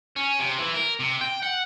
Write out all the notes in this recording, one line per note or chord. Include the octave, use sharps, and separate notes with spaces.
C#4
C3
E3
A#4
C3
G5
F#5